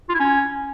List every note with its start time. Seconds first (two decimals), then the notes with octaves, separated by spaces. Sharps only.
0.09 F4
0.14 E4
0.20 C#4